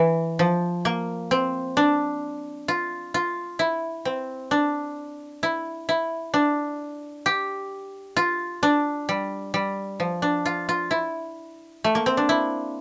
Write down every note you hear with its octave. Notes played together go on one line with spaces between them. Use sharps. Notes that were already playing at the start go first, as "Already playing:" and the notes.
Already playing: E3
F3
A#3
C4
D4
F4
F4
E4
C4
D4
E4
E4
D4
G4
F4
D4
G3
G3
F3
D4
F4
F4
E4
A3
A#3
C4
D4
E4